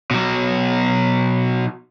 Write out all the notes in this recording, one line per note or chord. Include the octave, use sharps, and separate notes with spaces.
B2 F#3